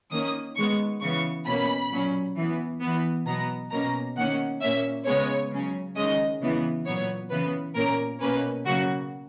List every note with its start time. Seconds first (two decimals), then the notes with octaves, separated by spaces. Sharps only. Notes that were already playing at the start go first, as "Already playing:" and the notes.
0.12 D#3 A#3 C#4 D#6
0.56 D#3 G#3 B3 C#6
1.01 C#3 E3 B3 C#6
1.46 B2 A#3 C#4 B5
1.91 A#2 F#3 C#4
2.36 E3 B3
2.81 E3 B3
3.26 B2 F#3 B3 A#5
3.71 B2 A#3 C#4 A#5
4.16 D#3 A#3 C#4 F#5
4.61 A#2 A#3 C#4 E5
5.05 C#3 G#3 B3 C#5
5.51 C#3 F#3 C#4
5.96 D#3 G#3 C#4 D#5
6.41 C#3 E3 B3
6.86 A#2 F#3 B3 C#5
7.30 C#3 E3 B3 B4
7.75 A#2 A#3 C#4 A#4
8.20 B2 A#3 C#4 B4
8.65 C#3 F#3 A#3 F#4